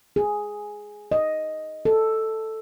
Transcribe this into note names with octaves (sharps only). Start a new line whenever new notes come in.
G#4
D#5
A4